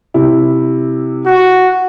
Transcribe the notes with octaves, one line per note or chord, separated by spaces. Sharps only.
C3 E4
F#4